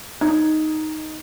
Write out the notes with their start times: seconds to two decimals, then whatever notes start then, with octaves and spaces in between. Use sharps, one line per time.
0.21 D#4 G#6